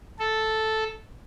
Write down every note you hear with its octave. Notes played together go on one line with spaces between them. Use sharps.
A4